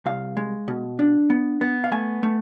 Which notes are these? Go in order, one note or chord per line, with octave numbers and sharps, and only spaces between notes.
C2 F5
G#3
B2
D4
B3
B3
F5
A3 G#5
A3